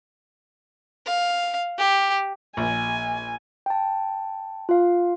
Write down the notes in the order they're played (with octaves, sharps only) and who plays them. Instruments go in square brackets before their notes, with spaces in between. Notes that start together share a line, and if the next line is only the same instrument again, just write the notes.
[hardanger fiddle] F5
G4
[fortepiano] A#1 [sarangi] G#5
[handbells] G5 A5
F4 F5